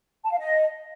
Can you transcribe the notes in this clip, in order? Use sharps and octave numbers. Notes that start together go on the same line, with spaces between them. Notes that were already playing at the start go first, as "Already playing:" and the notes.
A5
F5
D#5